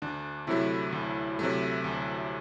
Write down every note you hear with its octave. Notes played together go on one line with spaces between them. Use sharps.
D2 D4
C3 F#3 A3 E4
D2
C3 F#3 A3
D2